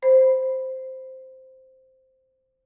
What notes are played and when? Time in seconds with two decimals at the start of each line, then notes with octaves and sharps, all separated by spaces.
0.02 C5 B5